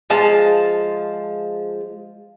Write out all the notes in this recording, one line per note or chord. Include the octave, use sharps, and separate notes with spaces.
F3 G#3 A5